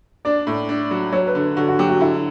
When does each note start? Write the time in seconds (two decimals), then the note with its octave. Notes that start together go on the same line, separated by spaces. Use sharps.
0.25 D4 D5
0.47 A2
0.69 D4
0.91 F#3
1.12 F#3 C#5
1.27 B4
1.35 D3
1.57 D3 F#4
1.68 F#4
1.79 F#3 G4
1.90 F#4
2.00 D3 E4